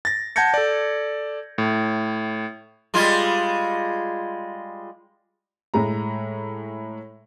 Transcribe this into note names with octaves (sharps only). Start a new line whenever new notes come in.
A6 A#6
F#5 A5 G6 G#6 A#6 C#7
A4 D5
A2
G3 G#3 F4
A2 G#3 A#5